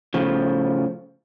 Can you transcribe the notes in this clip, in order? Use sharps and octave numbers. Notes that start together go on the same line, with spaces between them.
A2 C#3 F3